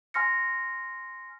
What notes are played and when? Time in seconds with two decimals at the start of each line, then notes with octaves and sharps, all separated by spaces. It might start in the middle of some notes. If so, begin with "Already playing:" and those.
0.14 G#5 C6 F6 A#6 C#7